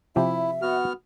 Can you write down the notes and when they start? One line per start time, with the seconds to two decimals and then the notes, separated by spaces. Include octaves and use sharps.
0.16 C3 F3 E4 G4 E5
0.62 B3 F#4 F6